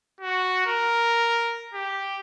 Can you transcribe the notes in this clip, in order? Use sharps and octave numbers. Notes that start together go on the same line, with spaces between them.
F#4
A#4
G4